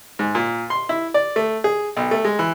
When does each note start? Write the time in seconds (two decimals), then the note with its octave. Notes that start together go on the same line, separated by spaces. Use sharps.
0.19 G#2
0.35 A#2
0.70 C6
0.89 E4
1.14 D5
1.36 A3
1.64 G#4
1.97 B1
2.11 A3
2.25 G#3
2.39 E3